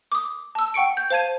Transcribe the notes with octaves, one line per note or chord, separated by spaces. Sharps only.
D6 D#6
A5 E6
F#5 G5 C#6 C#7 D7
G6
C5 F5 A5 G#6 D#7